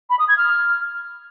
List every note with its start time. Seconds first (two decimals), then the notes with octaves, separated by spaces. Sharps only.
0.10 B5
0.19 D#6
0.28 G#6
0.37 F6